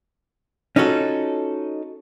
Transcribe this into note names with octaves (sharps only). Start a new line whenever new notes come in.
C#4 D#4 F4 F#4 A4